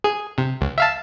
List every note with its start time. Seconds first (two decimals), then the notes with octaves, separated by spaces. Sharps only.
0.04 G#4
0.38 C3
0.61 C#2
0.78 E5 F5 A5